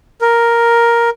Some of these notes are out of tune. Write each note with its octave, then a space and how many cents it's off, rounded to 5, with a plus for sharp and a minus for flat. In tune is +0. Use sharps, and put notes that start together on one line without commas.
A#4 +5